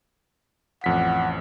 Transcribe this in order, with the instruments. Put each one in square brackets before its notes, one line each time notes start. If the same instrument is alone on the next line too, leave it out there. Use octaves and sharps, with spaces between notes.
[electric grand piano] A1 F2 B6 [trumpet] F#5